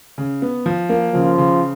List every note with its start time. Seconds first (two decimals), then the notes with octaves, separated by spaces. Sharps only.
0.18 C#3
0.42 B3
0.66 F3
0.89 A#3
1.13 C#3 F3
1.38 C#3